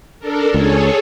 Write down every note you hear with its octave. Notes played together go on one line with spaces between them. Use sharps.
D4 A4 A#4
C#2 G#4 A4 C#5